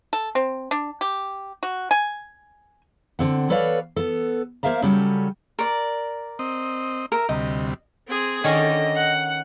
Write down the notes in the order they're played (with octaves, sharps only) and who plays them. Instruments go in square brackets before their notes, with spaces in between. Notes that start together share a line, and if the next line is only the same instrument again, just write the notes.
[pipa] A4
C4
D4
G4
F#4
G#5
[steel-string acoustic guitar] D3 C4 F#5
A4 B4 C#5 D5 F5
B3 A4
A#3 A#4 C5 E5 F5 A#5
C#3 F#3 G3 C#4 G4 A4
[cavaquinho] A#4 D5
[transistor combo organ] C4 D#5
[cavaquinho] A#4 [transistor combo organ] E5
[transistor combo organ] D2 C3 G3 [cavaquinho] D#5
[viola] C4 G#4
[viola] D3 [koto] D#3 C#4 [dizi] D#5
[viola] F#5